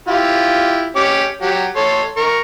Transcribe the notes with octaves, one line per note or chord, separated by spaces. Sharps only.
E4 F4 G4
C#4 G4 D6
F#3 G4
A4 C#5 C6
A#4 C#6